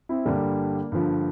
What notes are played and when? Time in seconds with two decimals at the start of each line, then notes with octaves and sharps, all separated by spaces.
0.09 C4 E4
0.26 G2 D3 G3 A#3 D4
0.92 G2 D3 F3